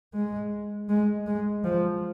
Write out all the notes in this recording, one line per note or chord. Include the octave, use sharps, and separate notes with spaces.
G#3
G#3
G#3
F3